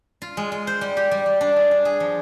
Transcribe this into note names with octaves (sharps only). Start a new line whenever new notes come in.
F4
G#3
G#3
C5
G3
G4
G3
G3
D4
G#4
D4
G#4
F3